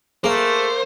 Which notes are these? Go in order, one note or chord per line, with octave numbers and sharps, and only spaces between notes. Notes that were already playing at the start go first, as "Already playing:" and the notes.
A3 A#3 G#4 C5